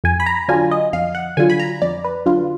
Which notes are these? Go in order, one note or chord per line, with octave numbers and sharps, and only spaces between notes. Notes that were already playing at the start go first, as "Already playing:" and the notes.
F2 G#5
B5
A#5
D3 F#3 D4 F4 G#5
D#5
F2 F5
F#5
D3 F#3 D4 F4 G#5
B5
A#5
F2 D5
B4
D3 F#3 D4 F4